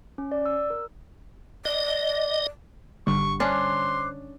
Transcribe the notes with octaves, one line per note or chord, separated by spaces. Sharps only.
C#4
D5
E6
A#4
D5 D#5
G#1 D3 G3 C#6
C#4 D4 C5 C6 D6 F#6